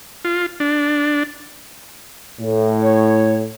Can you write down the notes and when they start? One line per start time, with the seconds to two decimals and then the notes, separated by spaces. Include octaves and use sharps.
0.25 F4
0.60 D4
2.40 A2
2.82 C#5